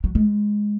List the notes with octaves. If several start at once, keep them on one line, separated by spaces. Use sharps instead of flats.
F#3
G#3